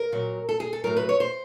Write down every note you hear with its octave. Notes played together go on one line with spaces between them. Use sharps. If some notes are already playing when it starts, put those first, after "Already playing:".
Already playing: A#4
A#2 F#3
A4
G#4
A4
A2 F#3 A#4
B4
C#5
C5